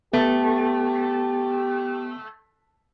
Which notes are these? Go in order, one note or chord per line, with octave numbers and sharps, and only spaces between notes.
A3 B3 G4